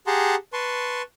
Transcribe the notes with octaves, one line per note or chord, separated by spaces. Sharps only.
G4 G#4 F#5 A5 A#5 C6
B4 A5 C6 C#6